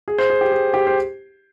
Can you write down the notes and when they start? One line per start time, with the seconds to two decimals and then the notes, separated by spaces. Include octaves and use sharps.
0.08 G#4
0.18 C5
0.30 G#4
0.41 G4
0.52 G#4
0.74 G4
0.87 C5